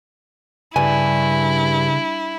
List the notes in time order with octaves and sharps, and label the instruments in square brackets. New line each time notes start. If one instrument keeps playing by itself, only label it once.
[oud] G2 [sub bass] C#3 [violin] E4 [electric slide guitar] G#5